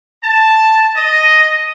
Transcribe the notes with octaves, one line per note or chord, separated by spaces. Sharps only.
A5
D#5